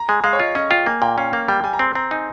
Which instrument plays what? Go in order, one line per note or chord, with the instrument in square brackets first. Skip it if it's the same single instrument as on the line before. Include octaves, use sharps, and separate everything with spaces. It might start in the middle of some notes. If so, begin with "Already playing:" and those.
Already playing: [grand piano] A#5
[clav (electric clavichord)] G#3 [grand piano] G#5
[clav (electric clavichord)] G#3 [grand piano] F5
[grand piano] C#5
[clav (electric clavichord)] F4 [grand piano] D#5
[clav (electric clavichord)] C#4 [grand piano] D#5
[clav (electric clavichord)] F4 [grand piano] G5
[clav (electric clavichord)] A#3 [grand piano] G#5
[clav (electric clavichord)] A#2 [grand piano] G5
[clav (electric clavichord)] C#4 [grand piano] F5
[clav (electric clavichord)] A#3 [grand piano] F5
[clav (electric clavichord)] G3 [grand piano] G5
[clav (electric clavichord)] G3 [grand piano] G#5
[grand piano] A#5
[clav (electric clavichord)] C4 [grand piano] C6
[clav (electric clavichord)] C4 [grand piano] A#5
[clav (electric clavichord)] D#4 [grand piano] G#5